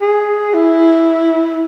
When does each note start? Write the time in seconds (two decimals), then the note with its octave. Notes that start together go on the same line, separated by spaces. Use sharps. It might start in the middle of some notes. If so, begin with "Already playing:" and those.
0.01 G#4
0.54 E4